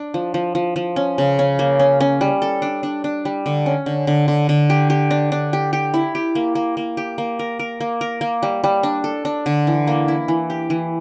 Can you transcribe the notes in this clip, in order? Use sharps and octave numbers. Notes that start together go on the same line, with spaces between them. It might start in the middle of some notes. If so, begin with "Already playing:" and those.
Already playing: D4
F3
F3
F3
F3
C#4
C#3
C#4
A#3
C#4
C#4
G3
A4
D4
D4
D4
G3
D3
C#4
D3
D3
D3
D3
G4
G4
D4
D4
G4
G4
E4
G4
A#3
A#3
A#3
G4
A#3
A#4
A#4
A#3
A#4
A#3
G3
G3
D4
A4
D4
D3
E3
A#3
E4
E3
G4
E3